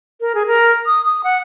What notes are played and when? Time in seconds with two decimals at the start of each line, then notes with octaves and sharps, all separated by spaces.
0.21 A#4
0.35 G#4
0.47 A#4
0.86 D#6
1.05 D#6
1.24 F#5